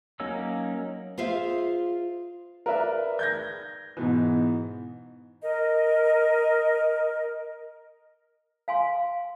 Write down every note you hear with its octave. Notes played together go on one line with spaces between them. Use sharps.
F#3 A#3 C#4 D#4 E6
F4 G#4 C5 E5 F5
A#4 B4 D5 E5
G6 G#6 A#6
G#2 B2 E3
A#4 D#5
F5 G#5 C6